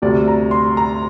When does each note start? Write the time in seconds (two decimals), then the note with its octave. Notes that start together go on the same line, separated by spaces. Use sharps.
0.02 D2 C3 G3 D5
0.28 A#5
0.51 C6
0.77 A#5